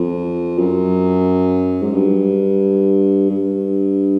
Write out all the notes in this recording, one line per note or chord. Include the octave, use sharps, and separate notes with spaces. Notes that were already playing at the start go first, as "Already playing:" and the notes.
Already playing: F2
F#2
G#2
G2
G2